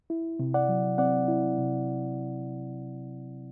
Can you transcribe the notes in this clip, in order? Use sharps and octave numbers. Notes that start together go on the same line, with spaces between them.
E4
C3
D5 F#5
F#3
C4 D5 F#5
E4
C3